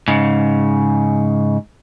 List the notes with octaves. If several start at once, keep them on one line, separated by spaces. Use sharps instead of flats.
G#2 C#3